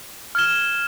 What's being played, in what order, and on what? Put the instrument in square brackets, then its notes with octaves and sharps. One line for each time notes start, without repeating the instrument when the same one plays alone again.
[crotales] F6 G#6 E7 G7